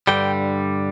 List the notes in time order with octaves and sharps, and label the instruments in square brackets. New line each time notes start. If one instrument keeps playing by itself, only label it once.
[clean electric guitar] G2 D3 G3 G5